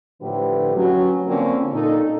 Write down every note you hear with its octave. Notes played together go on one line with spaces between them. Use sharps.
A2 D3 F3 G4 B4
F#3 C#4
D3 F3 A#3 C4 C#4
A#2 D#4 A4